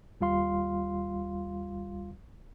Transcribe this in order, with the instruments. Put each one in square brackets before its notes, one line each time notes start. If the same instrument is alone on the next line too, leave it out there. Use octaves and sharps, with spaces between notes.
[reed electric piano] D#2 G3 F4 F5 C6